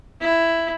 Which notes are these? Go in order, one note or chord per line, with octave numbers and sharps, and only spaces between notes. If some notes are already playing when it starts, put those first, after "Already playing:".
E4